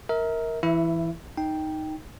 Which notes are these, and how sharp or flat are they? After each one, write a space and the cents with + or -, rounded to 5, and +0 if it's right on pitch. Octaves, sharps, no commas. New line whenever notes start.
A#4 +0 E5 -40
E3 +10 E4 +0 E5 +25
D#4 +0 G5 +0